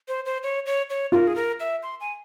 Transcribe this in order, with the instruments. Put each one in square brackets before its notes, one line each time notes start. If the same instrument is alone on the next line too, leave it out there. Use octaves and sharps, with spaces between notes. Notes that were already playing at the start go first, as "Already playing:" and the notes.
[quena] C5
C5
C#5
C#5
C#5
[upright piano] F4 [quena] A#4
[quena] G#4
A#4
E5
C6
G#5